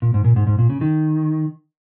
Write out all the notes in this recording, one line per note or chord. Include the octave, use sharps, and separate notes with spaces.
A#2
G#2
A#2
G#2
G#2
A#2
C#3
D#3